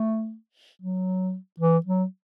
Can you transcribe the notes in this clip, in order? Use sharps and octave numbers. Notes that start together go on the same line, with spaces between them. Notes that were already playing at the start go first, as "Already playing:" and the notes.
Already playing: A3
F#3
E3
F#3